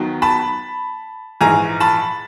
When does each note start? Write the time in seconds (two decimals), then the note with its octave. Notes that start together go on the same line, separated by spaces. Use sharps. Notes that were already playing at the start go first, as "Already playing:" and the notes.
Already playing: D#2 D#3 F#3 B3
0.22 A5 B5
1.41 A#1 G#2 E3 G#3 G#5 A#5
1.80 A5 B5